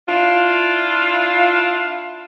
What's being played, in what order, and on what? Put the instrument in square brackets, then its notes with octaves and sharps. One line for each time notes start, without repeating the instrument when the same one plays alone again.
[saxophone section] D4 E4 F4